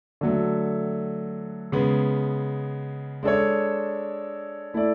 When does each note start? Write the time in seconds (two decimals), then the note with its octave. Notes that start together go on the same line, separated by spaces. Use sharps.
0.21 D3 F#3 A3
1.72 C#3 G#3 B3
3.23 G#3 D4 A4 C#5
4.74 A3 E4 A4 D5